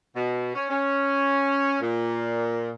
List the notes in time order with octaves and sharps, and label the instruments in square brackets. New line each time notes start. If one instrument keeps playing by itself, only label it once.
[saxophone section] B2
C#4
C#4
A#2